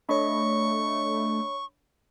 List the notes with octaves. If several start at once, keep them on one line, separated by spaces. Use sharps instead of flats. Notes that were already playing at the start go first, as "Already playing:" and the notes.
A3 D4 C#5 D#5 B5 C#6